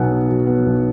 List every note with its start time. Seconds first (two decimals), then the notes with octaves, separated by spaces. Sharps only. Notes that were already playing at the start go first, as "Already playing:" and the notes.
Already playing: B1 B2 F#3 B3 F#5 G#5
0.11 B2
0.29 F#3
0.47 B3
0.66 B1